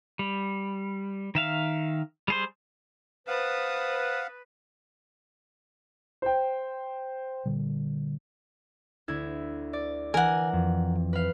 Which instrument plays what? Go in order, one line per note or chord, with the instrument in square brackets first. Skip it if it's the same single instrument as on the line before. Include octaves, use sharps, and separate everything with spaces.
[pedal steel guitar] G3
D#3 E5 F5
G3 G#4 C5
[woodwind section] B4 [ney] C5 [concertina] F5 F#5 [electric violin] A5 D#6
[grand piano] C5 G5
[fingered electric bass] A#2 D3 G3
[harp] D2 E4 G#6
D5
[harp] E3 [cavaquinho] A#4 F#5 [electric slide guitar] G#5
[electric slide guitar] F2
[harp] B4 F5